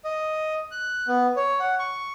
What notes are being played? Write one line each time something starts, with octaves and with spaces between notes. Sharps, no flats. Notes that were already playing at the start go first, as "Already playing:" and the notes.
D#5
F#6
B3
C#5
F#5
C#6